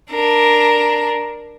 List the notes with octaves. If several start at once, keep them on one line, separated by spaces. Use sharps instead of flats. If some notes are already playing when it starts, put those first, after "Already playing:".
D4 A#4